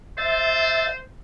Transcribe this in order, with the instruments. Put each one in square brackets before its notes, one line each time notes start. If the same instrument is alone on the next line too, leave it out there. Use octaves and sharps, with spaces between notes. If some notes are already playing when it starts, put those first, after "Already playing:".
[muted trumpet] C5 [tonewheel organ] E5 A6